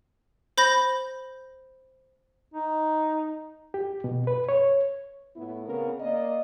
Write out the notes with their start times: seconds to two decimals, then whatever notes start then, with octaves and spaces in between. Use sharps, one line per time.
0.58 C5 B5 G6 A#6
2.54 D#4
3.74 G4
4.04 B2
4.27 B4
4.49 C#5
5.36 A2 B3 E4
5.66 C#3 B3 C4 A#4 B4
5.99 A#3 D5 D#5